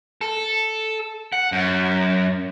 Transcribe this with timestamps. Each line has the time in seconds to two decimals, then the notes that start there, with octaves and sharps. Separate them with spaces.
0.21 A4
1.33 F#5
1.52 F#2